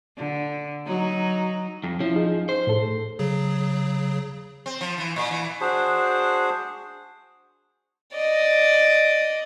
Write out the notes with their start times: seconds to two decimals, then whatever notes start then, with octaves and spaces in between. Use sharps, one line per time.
0.17 D3
0.86 F#3 D#4
1.84 F2
2.00 F3 C#4 E4
2.16 D#4 G#4
2.49 C5
2.67 A2 A4
3.19 C#3 F#3 G#4
4.66 C4
4.81 F3
4.98 E3
5.16 A#2
5.31 E3
5.61 D4 F#4 G#4 C5
8.14 D5 D#5